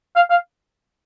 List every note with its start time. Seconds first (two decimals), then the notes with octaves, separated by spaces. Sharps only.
0.16 F5
0.30 F5